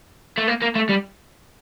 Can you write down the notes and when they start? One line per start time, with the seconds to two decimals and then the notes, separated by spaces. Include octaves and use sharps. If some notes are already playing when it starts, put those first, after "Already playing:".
0.37 A3
0.47 A#3
0.62 A#3
0.75 A3
0.89 G3